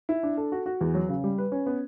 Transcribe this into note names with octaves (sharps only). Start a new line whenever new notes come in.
E4
D4
A4
F#4
F#4
E2
F#3
C#3
G3
B4
C#4
B3